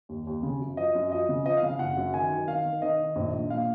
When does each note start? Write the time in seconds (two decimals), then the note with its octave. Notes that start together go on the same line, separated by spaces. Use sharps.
0.09 D#2
0.27 D#2
0.43 C#3
0.60 F#2
0.77 F3 D#5
0.95 F#2
1.12 F3 D#5
1.29 C#3
1.46 F3 D#5
1.57 F5
1.63 C#3
1.68 F5
1.79 F#1 F#5
1.97 F#2
2.14 D#3 G#5
2.31 D#3
2.48 D#3 F5
2.65 D#3
2.82 D#3 D#5
2.99 D#3
3.16 A#1
3.33 A#1
3.50 A#2 F5